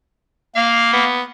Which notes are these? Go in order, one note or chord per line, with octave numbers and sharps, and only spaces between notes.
A#3 F5
B3